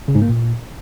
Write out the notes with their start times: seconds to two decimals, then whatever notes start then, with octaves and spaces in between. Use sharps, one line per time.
0.08 C#3
0.15 G#2
0.22 A#3
0.29 A#2